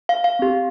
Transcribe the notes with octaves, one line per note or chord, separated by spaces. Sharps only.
F5
F5
C4 G4